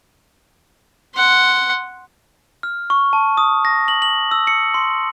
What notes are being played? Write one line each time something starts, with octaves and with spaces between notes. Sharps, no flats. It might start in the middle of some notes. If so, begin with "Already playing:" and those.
F#5 C6
F6
C#6
A5
D#6
A#6
F#7
F#7
E6
C#7
C6